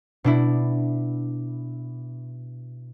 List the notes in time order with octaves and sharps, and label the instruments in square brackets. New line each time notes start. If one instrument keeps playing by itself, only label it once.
[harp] B2 D4 E4